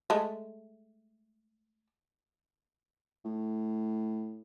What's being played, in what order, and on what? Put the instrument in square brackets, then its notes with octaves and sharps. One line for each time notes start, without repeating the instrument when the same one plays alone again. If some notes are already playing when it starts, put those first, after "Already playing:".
[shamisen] G#3 A3
[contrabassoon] A2